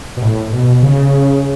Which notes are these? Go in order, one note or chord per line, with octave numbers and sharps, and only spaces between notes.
B2
A2
B2
C#3